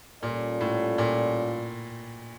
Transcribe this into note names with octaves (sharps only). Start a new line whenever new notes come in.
A#2 G3 C#4 F4 A4 D5
A2
A#2